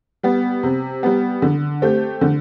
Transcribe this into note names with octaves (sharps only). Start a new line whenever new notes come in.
G3 B3
C3
G3 B3
D3
A3 C4 G4
D3